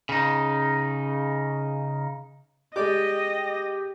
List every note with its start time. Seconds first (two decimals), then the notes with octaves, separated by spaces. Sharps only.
0.09 C#3 D#4
2.76 G#3 G4 D5 D#5 D6